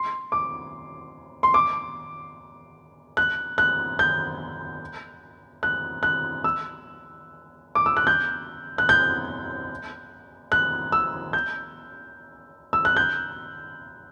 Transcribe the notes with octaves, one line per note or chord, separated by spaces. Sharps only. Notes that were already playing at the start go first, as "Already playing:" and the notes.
Already playing: C6
D6
C6
D6
F#6
F#6
G6
F#6
F#6
E6
D6
E6
F#6
G6
F#6
G6
F#6
E6
G6
E6
F#6
G6